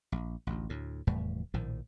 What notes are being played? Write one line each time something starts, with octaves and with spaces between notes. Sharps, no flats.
A#1
A1 D2
D2 A2
F1 E2 A2 G3
A#1 A2 D#3 F3